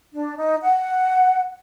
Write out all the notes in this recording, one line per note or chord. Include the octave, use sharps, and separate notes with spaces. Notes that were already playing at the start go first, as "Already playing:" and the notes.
D4
D#4
F#5